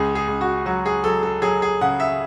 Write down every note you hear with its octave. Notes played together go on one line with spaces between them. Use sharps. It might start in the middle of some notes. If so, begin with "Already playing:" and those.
Already playing: C#2 G#4
G#4
C#2
F#4
F#3 F#4
G#4
F#3 A4
A4
F#3 G#4
G#4
C#3 F#5
E5